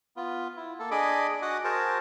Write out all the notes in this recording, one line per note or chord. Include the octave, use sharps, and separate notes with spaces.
B3 F4
E4
A#3 A4
D4 G#4 D#5 B5 D6
F#4 D#5 F#5 D6
F#4 G#4 A#4 C5 A5 A#5